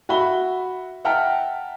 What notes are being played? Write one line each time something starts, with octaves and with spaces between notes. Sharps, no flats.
F#4 E5 B5 G7
E5 F#5 G5 A5 A#5 F6